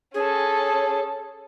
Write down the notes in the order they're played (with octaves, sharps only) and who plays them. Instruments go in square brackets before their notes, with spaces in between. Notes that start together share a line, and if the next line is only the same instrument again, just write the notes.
[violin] C#4 A4 [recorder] G#4